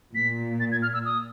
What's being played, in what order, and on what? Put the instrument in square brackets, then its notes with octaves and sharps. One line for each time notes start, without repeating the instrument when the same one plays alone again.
[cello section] A#2 [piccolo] B6
[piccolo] A6
G#6
F6
E6
D#6